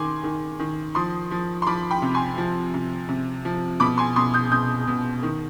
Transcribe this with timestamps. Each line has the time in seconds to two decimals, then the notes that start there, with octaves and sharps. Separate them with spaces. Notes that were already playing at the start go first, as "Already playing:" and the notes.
Already playing: D#3 G#5 C6 D6
0.24 D#3
0.59 D#3
0.95 F3 C6 D#6
1.31 F3
1.62 C6
1.67 F3 B5 D6
1.91 G5 B5
2.02 C3
2.14 G#5 C6
2.38 F3
2.74 C3
3.09 C3
3.45 F3
3.80 B2 B5 D6
3.98 G#5 C6
4.16 B2 C6 D#6
4.34 D#6 G6
4.52 B2 D#6 G6
4.87 B2
5.23 D#3